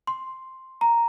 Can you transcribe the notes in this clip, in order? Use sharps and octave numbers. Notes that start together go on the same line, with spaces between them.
C6
A#5